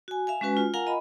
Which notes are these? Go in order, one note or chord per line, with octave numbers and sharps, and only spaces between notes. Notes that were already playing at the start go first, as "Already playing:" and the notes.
F#4 G#5
E5 F5 G#5
G#3 C#4 F#4 B4 G#5
F4
F4 A#4 F5 F#5 G#5 A#5
D#5 B5